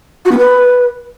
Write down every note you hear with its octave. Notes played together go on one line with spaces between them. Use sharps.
F#4
B3
B4